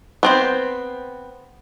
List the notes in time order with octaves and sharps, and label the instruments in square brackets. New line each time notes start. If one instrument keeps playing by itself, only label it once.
[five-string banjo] B3 C4 C5